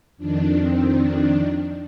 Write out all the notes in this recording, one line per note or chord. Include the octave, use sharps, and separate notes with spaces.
F2 D#3 D4
C4
D4